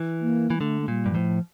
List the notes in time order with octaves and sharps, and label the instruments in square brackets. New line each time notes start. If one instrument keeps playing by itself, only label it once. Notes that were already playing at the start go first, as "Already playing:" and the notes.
Already playing: [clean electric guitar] E3
[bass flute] A#3
[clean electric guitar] E3
[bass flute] G3
[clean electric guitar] D3 [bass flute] A3
[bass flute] A3
[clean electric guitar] A#2 [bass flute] G3
[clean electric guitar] G2
[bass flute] E3
[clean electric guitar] A2 [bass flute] F3